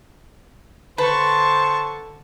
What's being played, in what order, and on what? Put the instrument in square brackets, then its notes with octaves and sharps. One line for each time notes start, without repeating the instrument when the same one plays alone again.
[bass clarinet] D3 [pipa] B4 [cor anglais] C5 [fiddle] A5 C#6